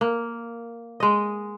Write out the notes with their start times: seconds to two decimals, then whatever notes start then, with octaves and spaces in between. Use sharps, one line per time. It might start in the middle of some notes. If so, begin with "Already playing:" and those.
0.01 A#3
1.00 G#3 D#5